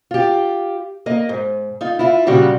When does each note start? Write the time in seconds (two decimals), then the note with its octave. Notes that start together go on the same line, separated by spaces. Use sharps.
0.11 F4 G4
1.06 A#3 D#5
1.29 G#2
1.81 D#4 F4
1.99 E4 F4
2.27 A#2 C#3 G3 F#4 G4